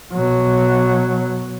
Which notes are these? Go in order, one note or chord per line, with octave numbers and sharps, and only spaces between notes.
B2 F#3